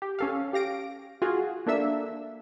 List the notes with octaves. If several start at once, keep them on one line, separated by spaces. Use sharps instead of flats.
G4
C#4 A4 F5
G4 F5 A#6 D7
F4 F#4 G#4
A#3 D4 A4 E5 E6